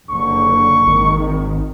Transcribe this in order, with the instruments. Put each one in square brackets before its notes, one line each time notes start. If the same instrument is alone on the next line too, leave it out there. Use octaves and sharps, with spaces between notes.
[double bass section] F#1 D3 [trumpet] C#6
[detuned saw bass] G#1 [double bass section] D#3